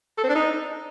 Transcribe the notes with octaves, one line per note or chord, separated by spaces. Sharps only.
A4
C4
D4
D#4